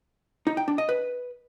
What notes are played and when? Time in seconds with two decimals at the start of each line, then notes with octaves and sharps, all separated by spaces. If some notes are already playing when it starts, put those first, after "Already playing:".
0.47 D#4
0.57 G5
0.68 D4
0.78 D#5
0.89 B4